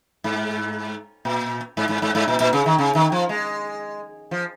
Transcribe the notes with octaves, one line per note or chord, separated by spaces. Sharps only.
G#2
A#2
G#2
G#2
G#2
G#2
A#2
A#2
C#3
D#3
C#3
D#3
F3
G#3
F3